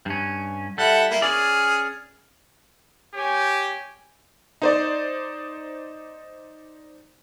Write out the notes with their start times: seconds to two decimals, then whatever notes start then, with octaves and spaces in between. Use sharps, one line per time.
0.06 G2 C#4
0.78 G3 E4 A4 F#5
1.10 A#3 E4
1.22 C#4 G#4 D5 F6
3.14 G4 C#5 G#5
4.62 D#4 C5 D5